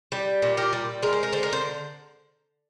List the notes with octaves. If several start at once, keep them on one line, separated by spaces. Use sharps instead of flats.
G3
A#2
G4 A#4
G3
G#3 A#4
C5
A#4
D3 C5
A#4
C5